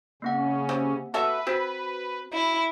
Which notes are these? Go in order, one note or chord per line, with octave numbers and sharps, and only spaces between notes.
C#3 A#3 C4 C#4 F#5
C3
F#4 A4 B4 E5
C4 F#4 B6
E4